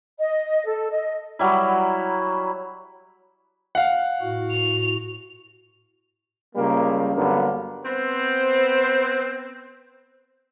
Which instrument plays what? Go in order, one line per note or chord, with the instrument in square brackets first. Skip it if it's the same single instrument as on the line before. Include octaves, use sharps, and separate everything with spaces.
[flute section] D#5
A4
D#5
[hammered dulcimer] F#3 G3 E4
[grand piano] F5 F#5
[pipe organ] A2 F#4
[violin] F7
[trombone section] C#2 G3 A#3
G2 D3 F#3 A#3 B3
[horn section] B3 C4 C5